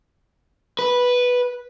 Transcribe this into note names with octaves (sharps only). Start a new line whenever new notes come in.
B4